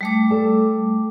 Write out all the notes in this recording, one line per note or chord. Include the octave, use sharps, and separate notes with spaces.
G3 A3 D6
A4 D5 A5